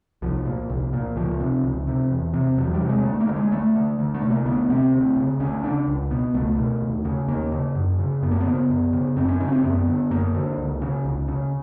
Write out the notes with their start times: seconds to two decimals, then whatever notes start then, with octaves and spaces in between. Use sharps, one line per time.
0.22 C2 F3
0.46 A#2
0.69 C2
0.93 A#2
1.16 C#2 F3
1.40 C3
1.64 C#2
1.87 C3
2.11 E2
2.34 C3
2.58 E2 F#3
2.74 G3
2.82 C3
2.89 G#3
3.05 D2 A3
3.20 A#3
3.28 D3
3.36 G#3
3.52 D2 A3
3.76 D3
3.99 D2
4.14 A3
4.22 C3
4.30 A#3
4.46 D2 B3
4.69 C3 C4
4.93 D2
5.17 C#3
5.40 D2 C#4
5.64 C#3 D4
5.87 C#2
6.10 B2 B3
6.34 C#2 A3
6.58 B2
6.81 D#2
7.05 C#3
7.28 D#2 A#3
7.52 C#3
7.75 F#2
7.99 C#3
8.22 F#2 B3
8.31 A#3
8.40 B3
8.46 C#3
8.69 F#2
8.93 C#3
9.17 F#2 C4
9.29 C#4
9.40 C#3 C4
9.48 C#4
9.52 C4
9.63 F#2 B3
9.87 D3
10.11 F#2 A#3
10.35 D3
10.57 C#2
10.82 C#3
11.05 C#2
11.28 C#3